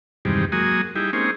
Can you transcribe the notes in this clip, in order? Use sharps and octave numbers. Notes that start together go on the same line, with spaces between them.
E2 G2 C3 D#3 G3 G#3
F#3 G#3 A#3 F#4 G#5 D#6
G3 D#4 E4 G4 G#4
G#3 A#3 C4 C#4 D#4 G#4